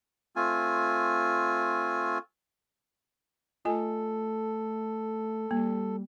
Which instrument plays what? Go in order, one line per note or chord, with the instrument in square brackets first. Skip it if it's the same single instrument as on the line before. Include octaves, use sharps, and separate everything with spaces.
[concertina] A3 C4 F4 G#5
[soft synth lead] A3 [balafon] F4 D#5 G#5 [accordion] A4
[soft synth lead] G3 [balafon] A#3